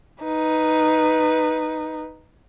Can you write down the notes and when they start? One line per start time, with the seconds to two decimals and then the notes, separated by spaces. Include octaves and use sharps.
0.24 D#4 B4